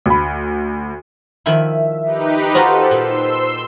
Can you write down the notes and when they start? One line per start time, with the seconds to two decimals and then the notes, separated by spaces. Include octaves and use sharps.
0.06 D2 B5
1.46 D#3 F3 E4 E5
2.04 D#4 G4 B4
2.55 F4 F#4 A4 C5 A#5
2.91 A#2 C6 E6